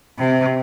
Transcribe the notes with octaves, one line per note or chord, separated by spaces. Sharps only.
C3